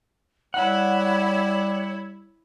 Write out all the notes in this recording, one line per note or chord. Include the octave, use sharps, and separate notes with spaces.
G3 E4 C#5 F#5